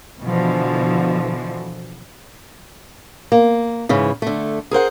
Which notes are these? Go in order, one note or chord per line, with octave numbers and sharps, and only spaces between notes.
B2 D3 E3 F3
A#3
G#2 C#3 E3
D3 A3
G#4 A#4 C5 F#5